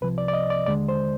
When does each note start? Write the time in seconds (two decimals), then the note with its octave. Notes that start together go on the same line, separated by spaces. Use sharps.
0.01 C2 C3 F3 B4
0.18 D5
0.28 D5
0.34 D#5
0.50 D5
0.67 D#2 D3 G#3 D5
0.89 C5